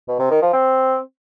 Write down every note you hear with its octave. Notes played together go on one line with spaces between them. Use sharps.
B2
C3
D#3
F3
C4